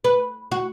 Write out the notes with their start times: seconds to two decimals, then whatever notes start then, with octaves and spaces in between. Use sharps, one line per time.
0.04 B4
0.52 F#4